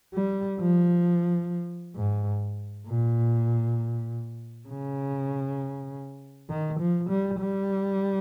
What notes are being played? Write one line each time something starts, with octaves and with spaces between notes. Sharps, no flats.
G3
F3
G#2
A#2
C#3
D#3
F3
G3
G3